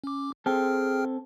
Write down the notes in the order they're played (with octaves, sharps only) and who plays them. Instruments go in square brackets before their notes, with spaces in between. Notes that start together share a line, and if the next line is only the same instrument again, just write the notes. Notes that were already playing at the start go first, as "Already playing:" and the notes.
[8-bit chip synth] C#4 D6
[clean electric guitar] C4 A4 [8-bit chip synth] G#4 G5 F6